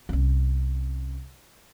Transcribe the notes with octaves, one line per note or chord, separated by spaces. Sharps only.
C2 C#4